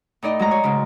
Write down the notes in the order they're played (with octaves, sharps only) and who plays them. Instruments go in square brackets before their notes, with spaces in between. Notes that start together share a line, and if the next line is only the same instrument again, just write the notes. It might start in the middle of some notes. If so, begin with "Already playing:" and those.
[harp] A2 D#4 D5 D#5
F#3 G#3 A#5
C#5
G#2 C#3